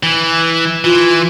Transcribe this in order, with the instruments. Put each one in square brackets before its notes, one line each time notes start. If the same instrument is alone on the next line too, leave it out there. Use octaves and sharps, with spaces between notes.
[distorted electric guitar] E3
[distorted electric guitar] E3 [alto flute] F4